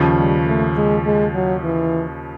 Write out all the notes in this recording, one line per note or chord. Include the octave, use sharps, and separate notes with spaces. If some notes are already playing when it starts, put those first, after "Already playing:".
Already playing: D#2 C#3 F3
G3
A3
G#3
G#3
F#3
E3